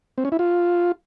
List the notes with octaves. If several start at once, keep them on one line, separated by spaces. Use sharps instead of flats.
C4
C#4
E4
F4